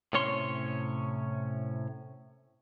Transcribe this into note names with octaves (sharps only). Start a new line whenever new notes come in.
A2 C3 C#4 C#5 C6